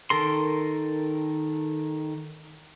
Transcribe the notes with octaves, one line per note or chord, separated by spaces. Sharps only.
D#3 A4 A#4 C6